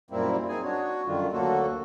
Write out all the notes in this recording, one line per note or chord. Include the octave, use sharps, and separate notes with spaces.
F#2 A#2 G3 A#3 C4 E4
C4 D#4 G#4 G#5
D4 F#4 C#5
F#2 D3 D#3 G3 F4
D2 D3 F#3 A#3 F#4 A4